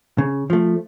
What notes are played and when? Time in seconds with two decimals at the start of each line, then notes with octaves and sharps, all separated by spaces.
0.18 C#3
0.50 F3 A3